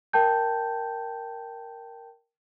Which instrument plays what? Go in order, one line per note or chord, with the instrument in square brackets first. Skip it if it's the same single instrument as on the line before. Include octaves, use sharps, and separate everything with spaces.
[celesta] A#4 G5 A5 G6